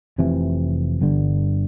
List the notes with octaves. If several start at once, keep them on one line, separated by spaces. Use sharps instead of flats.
F1 F2 C3 E3
G1 G2 D3